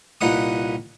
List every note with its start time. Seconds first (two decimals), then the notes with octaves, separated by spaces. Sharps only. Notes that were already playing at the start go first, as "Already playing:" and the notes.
0.21 C2 A#2 D#4 B4 F#5 D#6